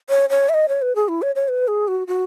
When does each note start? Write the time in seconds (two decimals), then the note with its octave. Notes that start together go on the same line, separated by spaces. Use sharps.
0.09 C#5
0.30 C#5
0.49 E5
0.54 D#5
0.69 C#5
0.82 B4
0.95 G#4
1.08 E4
1.22 C#5
1.35 C#5
1.48 B4
1.68 G#4
1.88 F#4
2.07 F#4